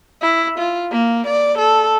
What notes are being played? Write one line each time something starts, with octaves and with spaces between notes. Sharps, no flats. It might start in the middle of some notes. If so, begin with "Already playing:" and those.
E4
F4
A#3
D5
A4